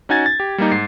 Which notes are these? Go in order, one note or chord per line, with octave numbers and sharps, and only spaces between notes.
C#4 D#4 F#4 G#5 G#6 A6
A6
G4
G3 A#3 D#4
G#2 C7